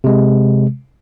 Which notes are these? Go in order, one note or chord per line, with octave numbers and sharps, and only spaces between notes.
C3 G#3